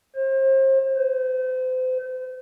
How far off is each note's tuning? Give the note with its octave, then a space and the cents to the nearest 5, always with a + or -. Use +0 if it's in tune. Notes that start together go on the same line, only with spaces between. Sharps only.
C5 +35
C5 -35